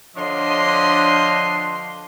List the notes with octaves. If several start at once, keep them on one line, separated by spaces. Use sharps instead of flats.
D3 F3 D4 C#5 D#5 C6